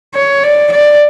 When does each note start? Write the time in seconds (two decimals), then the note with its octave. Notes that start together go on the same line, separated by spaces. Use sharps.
0.15 C#5
0.44 D5
0.71 D5